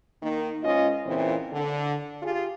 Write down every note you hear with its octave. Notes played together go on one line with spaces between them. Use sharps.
D#3 A#3 D#4
G#2 G#3 C#4 F4 D#5
A#2 C#3 E3 C4
D3
F4 G4 G#4